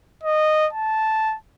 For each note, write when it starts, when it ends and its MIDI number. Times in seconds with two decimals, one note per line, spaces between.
0.23 0.68 75
0.73 1.36 81